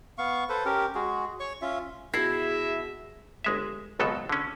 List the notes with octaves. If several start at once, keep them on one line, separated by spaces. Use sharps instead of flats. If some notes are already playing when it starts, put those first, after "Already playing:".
B3 F5 C#6
A4 B4 C5
C#4 G4 A#4
G#3 F#4 G#4
C#5 C#6
C#4 F4 E5
B2 E4 G#4 E5 A#6 C7
G1 G#3 E5
G#1 C#2 B2 F#3 A4
D3 C#4